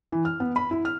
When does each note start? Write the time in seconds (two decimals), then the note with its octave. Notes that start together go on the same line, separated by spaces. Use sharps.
0.12 E3
0.25 F6
0.40 B3
0.56 B5
0.71 E4
0.85 F6